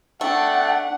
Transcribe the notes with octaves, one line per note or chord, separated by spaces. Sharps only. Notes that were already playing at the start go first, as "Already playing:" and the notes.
A3 D4 F#5 G5